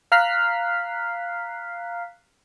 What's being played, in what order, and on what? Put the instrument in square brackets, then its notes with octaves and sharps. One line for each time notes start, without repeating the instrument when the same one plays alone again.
[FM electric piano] F5 A#5 F6 F#6 B6 C7